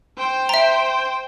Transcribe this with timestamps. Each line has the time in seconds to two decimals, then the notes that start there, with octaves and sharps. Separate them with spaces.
0.18 C5 G5
0.49 E5 A#5